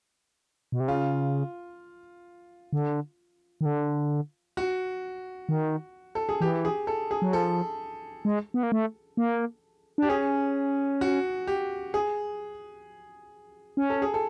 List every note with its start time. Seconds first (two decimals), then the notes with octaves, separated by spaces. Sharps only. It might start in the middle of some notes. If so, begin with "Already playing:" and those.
0.72 B2
0.80 C3
0.88 C#3 F4
2.73 D3
3.61 D#3
3.65 D3
4.57 F#4
5.49 D#3
6.15 A4
6.29 G#4
6.41 E3 G4
6.65 G#4
6.87 A4
7.11 G#4
7.22 F#3
7.33 F3 A4
8.25 G#3
8.54 B3
8.63 A#3
8.72 A3
9.17 A#3
9.98 D4 G4
10.09 C#4 G#4
11.01 F#4
11.47 G4
11.94 G#4
13.77 C#4
13.90 A4
14.02 G#4
14.14 A4